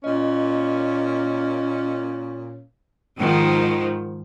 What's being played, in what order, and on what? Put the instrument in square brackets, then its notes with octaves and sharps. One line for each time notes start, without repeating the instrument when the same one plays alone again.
[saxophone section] A#2 A#3 C#4 [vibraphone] D#5
[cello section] G#2 D#3 F3